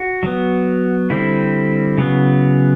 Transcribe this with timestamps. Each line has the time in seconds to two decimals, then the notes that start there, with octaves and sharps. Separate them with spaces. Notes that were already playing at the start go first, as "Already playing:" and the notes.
Already playing: F#4
0.23 F#3 B3
1.10 D3 G3 C4 E4
1.98 C#3 F#3 B3